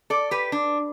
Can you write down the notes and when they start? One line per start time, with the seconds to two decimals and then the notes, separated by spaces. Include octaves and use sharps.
0.10 A4 D5
0.31 G4 B4
0.52 D4